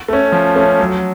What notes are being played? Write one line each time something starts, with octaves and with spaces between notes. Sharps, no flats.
A3 C#4
F3
A3 C#4
F#3